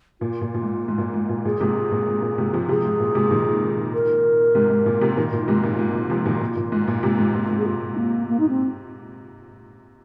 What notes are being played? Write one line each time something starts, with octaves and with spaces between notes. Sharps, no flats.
A#2 F4
A#2
A#2
G#2
G#2
A#2
G#2
A#2
A#2 G#4
G#2 C3
A#2
G#2
A#2
G#2 C3
C3 F3
C3 F3 G#4
G#2
A#2
G#2 C3
A#2 D#3
A#4
G#2 C3
G#2
A#2
G#2 C3
A#2 D#3 F4
A#2
G#2 C3
A#2
G#2
A#2
C3 F3
A#2 D#3
A#2
A#2
G#2
A#2
G#2 C3
G#2
A#2
G#2
G#4
F4
A#3
A#3
D#4
C4